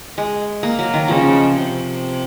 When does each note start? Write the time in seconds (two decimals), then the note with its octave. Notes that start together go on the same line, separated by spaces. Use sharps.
0.18 G#3
0.63 A#3
0.79 F#3
0.94 D#3
1.08 C#3 F3
1.54 C3